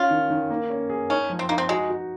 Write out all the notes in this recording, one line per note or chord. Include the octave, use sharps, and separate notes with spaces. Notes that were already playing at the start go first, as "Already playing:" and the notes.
Already playing: C#4 F4
D#3
D#3
A#3
C#4
G#4
C#4 D#4
F3
C4
A#3 D#4
C4
G#3 F#4
F#4